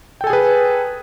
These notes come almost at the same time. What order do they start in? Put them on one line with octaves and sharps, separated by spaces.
G5 A4 G#5 G#4 B4